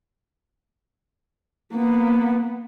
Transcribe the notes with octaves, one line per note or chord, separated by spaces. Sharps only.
A#3 B3